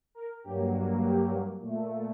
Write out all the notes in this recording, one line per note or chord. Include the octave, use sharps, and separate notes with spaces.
A#4
G2 F#3 A#3 G4
G4
A#2 A3